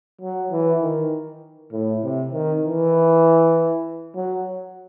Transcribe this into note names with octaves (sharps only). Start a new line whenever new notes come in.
F#3
E3
D#3
A2
C3
D#3
E3
F#3